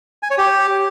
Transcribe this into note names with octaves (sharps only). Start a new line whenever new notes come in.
G#5
C#5
G4